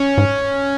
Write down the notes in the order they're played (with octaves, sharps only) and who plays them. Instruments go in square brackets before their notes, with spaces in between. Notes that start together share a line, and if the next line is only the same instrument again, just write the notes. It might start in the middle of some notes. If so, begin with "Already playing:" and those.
Already playing: [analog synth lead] C#4
[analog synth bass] G#2